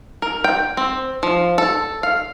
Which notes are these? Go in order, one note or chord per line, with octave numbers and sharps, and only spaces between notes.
A#4
G5
C4
F3
A4
F5